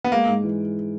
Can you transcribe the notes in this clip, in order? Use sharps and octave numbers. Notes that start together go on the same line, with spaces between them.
B3
G#3 A#3
G#2
E3